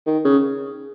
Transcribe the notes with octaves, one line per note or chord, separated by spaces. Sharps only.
D#3
C#3